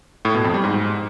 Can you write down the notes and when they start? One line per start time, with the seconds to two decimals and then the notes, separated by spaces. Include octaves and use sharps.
0.25 A2
0.35 B2
0.44 F2
0.54 G3
0.64 G#2